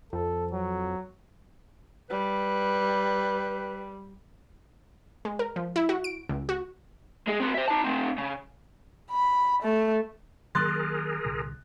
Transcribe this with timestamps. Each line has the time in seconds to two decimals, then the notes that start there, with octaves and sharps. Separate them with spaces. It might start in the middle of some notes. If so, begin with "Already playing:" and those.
0.13 F2 A4
0.51 F#3
2.10 G3 B4
5.25 G#3
5.39 A#4
5.56 F3
5.76 E4
5.89 F#4
6.04 D7
6.29 C#2
6.49 F#4
7.27 G#3 G#4
7.40 C4 F#4
7.54 C5 E5
7.68 D#4 A5
7.84 A3 C4
8.18 C#3
9.11 B5
9.62 A3
10.55 D#3 F#3 A#3 G#4 A#4 C6 F#6 A6
11.24 C2 A#2 D3